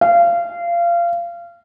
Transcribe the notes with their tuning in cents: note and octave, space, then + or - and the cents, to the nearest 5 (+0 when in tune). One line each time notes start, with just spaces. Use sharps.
F5 -25